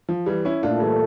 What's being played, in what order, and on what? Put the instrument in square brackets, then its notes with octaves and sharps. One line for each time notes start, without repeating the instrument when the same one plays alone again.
[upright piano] F3
E3 G3
C#4 E4
[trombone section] A#2 A3 E4 A4 [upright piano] D4 F4
[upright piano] E3 G3